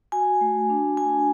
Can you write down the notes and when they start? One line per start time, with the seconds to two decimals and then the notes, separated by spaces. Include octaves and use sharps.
0.12 F#4 G#5
0.41 A3
0.70 D4
0.97 A3 G#5